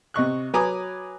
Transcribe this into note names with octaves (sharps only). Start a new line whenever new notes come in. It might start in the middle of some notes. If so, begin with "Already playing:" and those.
C3 D#5 C#6 F#6
F#3 B4 G#5 A#5 D6 D#6